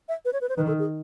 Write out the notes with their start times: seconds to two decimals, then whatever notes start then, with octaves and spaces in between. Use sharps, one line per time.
0.09 E5
0.25 B4
0.33 C#5
0.41 B4
0.49 C5
0.57 D#3 B4
0.67 A4
0.79 G#4